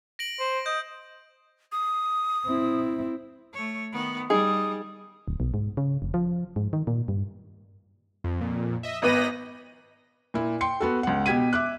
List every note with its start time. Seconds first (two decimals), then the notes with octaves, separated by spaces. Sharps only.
0.19 A#6 D7 F#7
0.40 C5
0.66 D#5 G6
1.72 D#6
2.46 C4 E4
3.53 A3 C#5
3.93 D#3 B3
4.30 G3 D#4 G#4 D#6
5.28 D1
5.40 B1
5.54 G#2
5.77 C#3
6.02 F1
6.14 F3
6.56 G#2
6.73 D#3
6.87 A#2
7.08 G2
8.24 F2
8.41 F2 A#2
8.83 D#5 E5
9.02 G#1 B3 D#5 B5 A#6 D#7
10.34 A#2 E4
10.61 G5 C6 C#7
10.80 B3 F#4 A4
11.03 C#2 F#5
11.26 B2 G4 G#6 B6 D#7
11.53 E5 D6 F#6